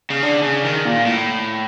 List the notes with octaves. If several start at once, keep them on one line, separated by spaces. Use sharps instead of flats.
C#3
D3
C#3
D#3
A#2
A2